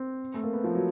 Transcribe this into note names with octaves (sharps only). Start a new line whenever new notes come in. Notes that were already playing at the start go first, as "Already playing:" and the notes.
Already playing: C4
A3
A#3
B3
F3
F#3